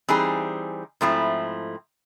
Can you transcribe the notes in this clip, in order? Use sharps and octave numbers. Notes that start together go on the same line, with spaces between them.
E3 G3 C4 D#4 G#4
G#2 F3 A3 C4 E4